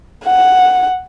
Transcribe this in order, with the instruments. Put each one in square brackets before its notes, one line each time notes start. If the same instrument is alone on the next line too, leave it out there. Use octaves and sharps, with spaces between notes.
[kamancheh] F#5